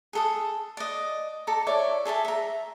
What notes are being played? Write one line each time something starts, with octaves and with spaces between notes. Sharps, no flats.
G#4 A4 D#6
D5 D#5
A4 D5 A#5
E4 A4 C#5 D5
G#4 A4 E5 A5
E5 A#5